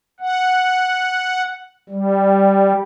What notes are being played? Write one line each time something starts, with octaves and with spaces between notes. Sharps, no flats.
F#5
G3